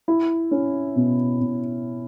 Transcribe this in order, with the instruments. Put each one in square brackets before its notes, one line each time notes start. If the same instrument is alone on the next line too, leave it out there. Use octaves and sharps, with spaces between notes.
[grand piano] E4
C#4
B2
B2